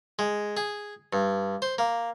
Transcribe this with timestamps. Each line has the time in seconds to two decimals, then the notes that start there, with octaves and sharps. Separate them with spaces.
0.19 G#3
0.57 G#4
1.13 G2
1.62 C5
1.78 A#3